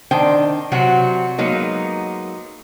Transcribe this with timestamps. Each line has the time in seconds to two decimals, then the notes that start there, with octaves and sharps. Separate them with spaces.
0.11 D#3 D4 C5 G5
0.72 C3 F#3 C4 F#4
1.38 F#3 G#3 A#3 B3 D#4